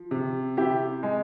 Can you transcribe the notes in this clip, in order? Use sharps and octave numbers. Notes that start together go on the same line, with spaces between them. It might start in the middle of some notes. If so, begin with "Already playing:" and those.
Already playing: F3
C3
C3 E4 G4
G#3